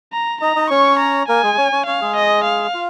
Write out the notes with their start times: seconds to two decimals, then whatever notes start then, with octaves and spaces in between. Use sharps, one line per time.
0.13 A#5
0.41 D#4 D#5 A#5
0.56 D#4 D#5
0.70 C#4 C#5 C#6
1.00 A#5
1.29 A#3 A#4 G#5
1.43 G#3 G#4
1.58 C#4 C#5
1.72 C#4 C#5
1.87 C#4 C#5 F5
2.01 G#3 G#4
2.16 D#5
2.45 F5
2.74 F4